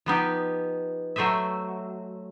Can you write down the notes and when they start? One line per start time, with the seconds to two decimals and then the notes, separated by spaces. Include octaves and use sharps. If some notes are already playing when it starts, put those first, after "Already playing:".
0.06 F3 B3 D#4 G4
1.16 F#3 A3 C5 D#5 E5